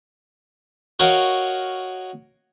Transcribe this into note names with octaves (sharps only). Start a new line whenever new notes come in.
F#4 A#4 C#5 D#5 F5 G5